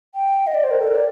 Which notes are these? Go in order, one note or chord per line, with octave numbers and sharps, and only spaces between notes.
G5
D#5
D5
C5
A#4
A4
A#4
D5